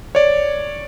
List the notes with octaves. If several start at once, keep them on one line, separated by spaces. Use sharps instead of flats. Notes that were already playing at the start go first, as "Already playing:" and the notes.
C#5 D5